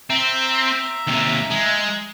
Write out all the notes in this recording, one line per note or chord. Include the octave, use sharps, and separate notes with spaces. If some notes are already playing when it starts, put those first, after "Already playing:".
C4 E5 A#5
D#2 C3
G#3